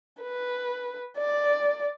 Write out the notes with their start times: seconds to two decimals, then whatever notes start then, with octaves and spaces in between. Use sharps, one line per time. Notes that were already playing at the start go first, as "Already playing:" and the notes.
0.22 B4
1.18 D5